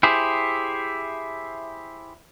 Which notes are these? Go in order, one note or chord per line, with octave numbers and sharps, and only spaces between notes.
E4 G4 G#4 C5